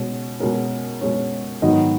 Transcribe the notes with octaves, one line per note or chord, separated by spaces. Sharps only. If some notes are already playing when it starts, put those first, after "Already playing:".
Already playing: B2 G#3 C#4
B2 G#3 C#4 A#4
B2 G#3 C#4 C#5
G#2 D#3 F#3 B3 D#5